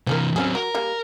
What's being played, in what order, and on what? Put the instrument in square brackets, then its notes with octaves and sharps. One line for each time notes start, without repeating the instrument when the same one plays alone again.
[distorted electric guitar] C3 E3 [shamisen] F3 A4 A#4
[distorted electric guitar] F#3 C4 [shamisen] G3 C#4 G#4
[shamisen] F#3 [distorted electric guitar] A#4
[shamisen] G3 G#3 A#3